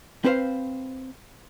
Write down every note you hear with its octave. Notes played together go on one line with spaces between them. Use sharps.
C4 B4 C5 F5